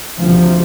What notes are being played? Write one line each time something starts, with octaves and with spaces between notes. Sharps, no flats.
D2 C3 F3